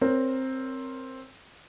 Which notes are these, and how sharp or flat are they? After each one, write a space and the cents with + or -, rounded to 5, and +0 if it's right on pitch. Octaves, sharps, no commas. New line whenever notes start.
C4 +10 A#4 +0 C#5 +15